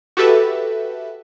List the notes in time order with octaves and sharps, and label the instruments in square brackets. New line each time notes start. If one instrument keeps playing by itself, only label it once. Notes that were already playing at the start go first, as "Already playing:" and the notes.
[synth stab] F#4 G4 A4 B4 E5